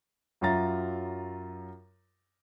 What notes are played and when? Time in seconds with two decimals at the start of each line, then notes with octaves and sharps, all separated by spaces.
0.41 F#2 F#3 F4 E5 A#5 A6